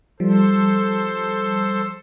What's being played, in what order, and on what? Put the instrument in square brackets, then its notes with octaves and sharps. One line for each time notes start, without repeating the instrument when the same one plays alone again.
[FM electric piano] F3 G3 [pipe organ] A4 C5